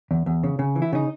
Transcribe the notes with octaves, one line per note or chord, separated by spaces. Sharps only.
E2
E2
C#3
C#3
E3
E4
C#3 D#4